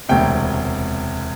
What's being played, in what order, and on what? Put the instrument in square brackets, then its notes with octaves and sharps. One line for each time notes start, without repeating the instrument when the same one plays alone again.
[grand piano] E1 D2 C3 G5